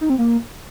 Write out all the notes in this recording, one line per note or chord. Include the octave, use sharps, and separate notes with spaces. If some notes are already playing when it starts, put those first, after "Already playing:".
D#4
C4
A#3